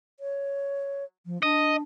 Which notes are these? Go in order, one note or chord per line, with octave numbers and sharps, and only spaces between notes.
C#5
F3
D4 D#5